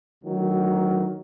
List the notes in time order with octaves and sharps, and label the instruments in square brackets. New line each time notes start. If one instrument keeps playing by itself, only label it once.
[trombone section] D2 D#3 F#3